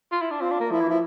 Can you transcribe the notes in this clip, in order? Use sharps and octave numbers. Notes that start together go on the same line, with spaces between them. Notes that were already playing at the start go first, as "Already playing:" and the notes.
F4
E4
D4
C4 F4
D4
A#3
F3 E4
E3
F3 E4